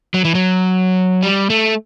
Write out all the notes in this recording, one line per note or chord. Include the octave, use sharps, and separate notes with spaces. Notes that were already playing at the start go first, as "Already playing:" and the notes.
F#3
E3
F#3
G3
A3